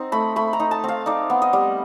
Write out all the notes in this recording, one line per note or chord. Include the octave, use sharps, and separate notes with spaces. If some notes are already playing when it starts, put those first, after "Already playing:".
Already playing: C4 D#4
A3 B5
A3 B5
A#5
D#4
A5
C4 F5
D#4 D5
B3
D#5
G3